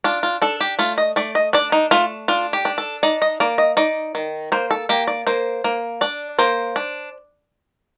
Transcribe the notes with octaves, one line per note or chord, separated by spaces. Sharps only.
D4 F4
F4
D4 A4
G4
A3 F4
D#5
A3 D5
D#5
D4 D5
D#4
A3 F4
D4 F4
G4
D4
A4
D#4 D5
D#5
A#3 D5
D#5
D#4 D5
D#3
A#3 C5
A4
A#3 G4
D5
A#3 C5
A#3
D4 D5
A#3 C5
D4